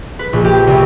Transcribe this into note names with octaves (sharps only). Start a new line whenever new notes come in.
B4
A#1
G4
C2